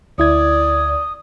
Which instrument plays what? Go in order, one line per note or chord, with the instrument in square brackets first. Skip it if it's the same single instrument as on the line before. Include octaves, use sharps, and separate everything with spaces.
[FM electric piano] D2 E4 G#6 [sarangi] D5 [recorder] D#6